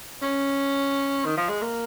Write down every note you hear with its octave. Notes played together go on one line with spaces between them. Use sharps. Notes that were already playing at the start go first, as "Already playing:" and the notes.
C#4
D#3
F3
G#3
A#3